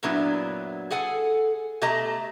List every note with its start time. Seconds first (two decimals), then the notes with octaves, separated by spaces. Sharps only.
0.03 F#2 A#2 F#3 B3 D4 E4
0.91 G#4 A4 F#5 G#5
1.82 B2 A3 G4 D#5 A5 A#5